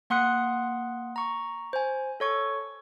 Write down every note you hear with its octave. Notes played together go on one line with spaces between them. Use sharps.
A#3 F#5 C6 D#6 F#6 C#7
A#5 C#6
C5 G#5
A4 C#5 C#6